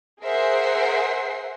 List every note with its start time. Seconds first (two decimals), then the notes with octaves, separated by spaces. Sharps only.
0.22 G#4 A#4 C5 E5 F#5 C7